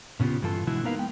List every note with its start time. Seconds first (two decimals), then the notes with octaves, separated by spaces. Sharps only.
0.20 A#2 C#3 B3 F4 G4
0.42 G2 E3 F4 A4
0.67 B2 D3 E3 G#3 E4 F#4
0.84 A#3 B3 D#4 A#4 B4 F5
0.96 G#3 B3 G5